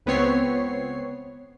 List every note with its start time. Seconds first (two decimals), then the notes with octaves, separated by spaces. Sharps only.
0.06 C#2 B3 C4 C#5 C7